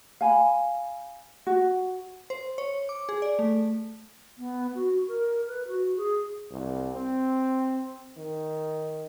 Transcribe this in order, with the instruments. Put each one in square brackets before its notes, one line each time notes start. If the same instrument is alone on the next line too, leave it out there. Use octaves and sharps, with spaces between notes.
[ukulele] F5 G#5 B5
F#4
[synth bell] C5
C#5
D6
G#4
D5
A3
[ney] B3
F#4
A#4
B4
F#4
G#4
[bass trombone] C2
C4
D#3